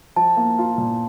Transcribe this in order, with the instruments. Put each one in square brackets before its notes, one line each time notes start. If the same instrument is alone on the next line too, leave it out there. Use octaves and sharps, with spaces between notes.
[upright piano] F3 [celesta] A5
[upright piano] A#3
F4
A#2